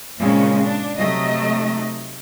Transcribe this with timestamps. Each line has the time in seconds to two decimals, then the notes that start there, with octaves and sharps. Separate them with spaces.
0.19 A#2 C#3 G#3 C4 C#4
0.64 D4
0.97 C3 F#3 A3 D#4 D#5